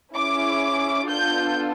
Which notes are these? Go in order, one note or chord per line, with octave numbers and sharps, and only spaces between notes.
C#4 E4 G#4 D6
B3 D4 F4 A4 G6